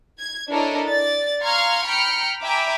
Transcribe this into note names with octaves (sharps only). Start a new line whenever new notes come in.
G#6
D4 E4 A4 A#4 C#5 D#5
D5 A6
F5 A#5 C6 C#6 F6 G#6
G5 A#5 B5 F6 C#7
E5 G5 G#5 A#5 B5 D6